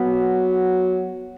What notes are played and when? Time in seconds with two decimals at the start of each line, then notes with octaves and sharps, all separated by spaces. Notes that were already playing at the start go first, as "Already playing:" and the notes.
Already playing: F#3 B3